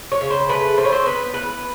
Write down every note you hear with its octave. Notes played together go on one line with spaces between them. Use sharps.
C#5
C#3
C5
A3 B4
C4 C5
C#5
C5
B3 B4
E3 B4